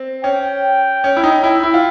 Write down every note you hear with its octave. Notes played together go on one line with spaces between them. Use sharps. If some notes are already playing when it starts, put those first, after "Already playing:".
Already playing: C4
C#4 G5
C#4
E4
D#4
E4 G5
E4
F4